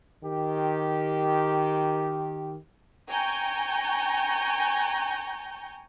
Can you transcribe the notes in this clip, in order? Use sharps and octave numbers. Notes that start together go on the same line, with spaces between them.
D#3 G4
G5 G#5 A#5 C#6 G6